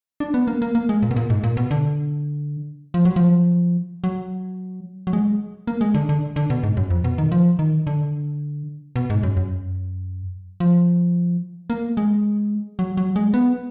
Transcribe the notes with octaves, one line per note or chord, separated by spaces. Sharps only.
D4
B3
A#3
A#3
A#3
G#3
A#2
B2
A#2
G#2
A#2
B2
D3
F3
F#3
F3
F#3
F#3
G#3
A#3
G#3
D3
D3
D3
B2
G#2
F#2
F2
B2
D#3
F3
D#3
D3
B2
G#2
F#2
F#2
F3
A#3
G#3
F#3
F#3
G#3
B3